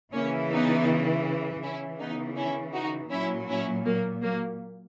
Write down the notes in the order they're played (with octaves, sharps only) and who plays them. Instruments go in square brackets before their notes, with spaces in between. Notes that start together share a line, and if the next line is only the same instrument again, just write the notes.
[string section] C#3 E3 A#3 C#4
B3 D#4
C#3 E3 C#4 E4
B3 D#4
C#4 E4
D#4 F#4
A#2 F#3 C#4 E4
C#4 E4
F#3 A#3
F#3 A#3